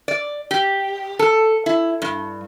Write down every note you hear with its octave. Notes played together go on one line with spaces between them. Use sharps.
D5
G4
A4
E4
G2